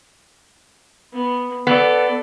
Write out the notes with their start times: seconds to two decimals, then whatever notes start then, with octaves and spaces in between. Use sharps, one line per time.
1.12 B3
1.67 B3 A4 D5